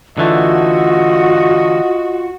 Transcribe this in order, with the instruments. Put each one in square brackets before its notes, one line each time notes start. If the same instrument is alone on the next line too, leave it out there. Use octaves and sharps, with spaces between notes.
[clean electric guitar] D3 E3 A3 [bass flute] F4 [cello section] F#4 [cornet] D#5